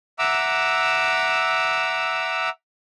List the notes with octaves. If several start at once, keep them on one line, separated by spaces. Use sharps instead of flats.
E5 F#5 A#5 D6 E6